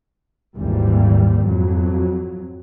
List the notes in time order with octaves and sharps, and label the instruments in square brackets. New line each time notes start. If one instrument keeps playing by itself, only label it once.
[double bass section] G#1 D#2 A#2 E3 G3 A#3
F2 F#3